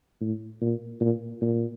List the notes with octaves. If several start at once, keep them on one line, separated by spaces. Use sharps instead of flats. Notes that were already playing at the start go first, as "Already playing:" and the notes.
A2
A#2
A#2
A#2